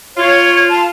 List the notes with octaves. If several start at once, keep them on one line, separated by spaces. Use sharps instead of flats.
F4 C#5
A5